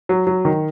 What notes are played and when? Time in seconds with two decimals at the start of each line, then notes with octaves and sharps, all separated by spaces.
0.09 F#3
0.27 F#3
0.45 D#3